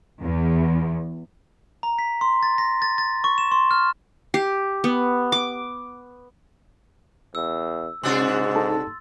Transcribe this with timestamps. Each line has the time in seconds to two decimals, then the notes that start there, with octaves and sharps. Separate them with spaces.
0.22 E2
1.83 A#5
1.99 B6
2.21 C6
2.43 A6
2.58 A#6
2.82 A6
2.98 A6
3.24 C#6
3.38 E7
3.51 C6
3.71 F6
4.34 G4
4.84 B3
5.32 D6
7.35 E2 E6
8.03 G#2 C3 D4 F#4 C6 E6 A6
8.56 D#4 A4 A5